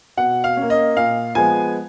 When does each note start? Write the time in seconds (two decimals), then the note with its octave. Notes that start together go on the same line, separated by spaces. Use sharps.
0.17 B2 F#5
0.44 F5
0.57 A#3 C#4
0.70 D#5
0.97 A#2 F5
1.35 F3 G#3 B3 G#5